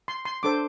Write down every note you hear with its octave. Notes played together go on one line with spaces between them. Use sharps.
C6
C6
D4 A4 C5 D6